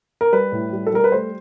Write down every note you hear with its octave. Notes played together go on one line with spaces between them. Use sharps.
A#4
G3 B4
A2
G3
A4
G3 A#4
B4
A3 C5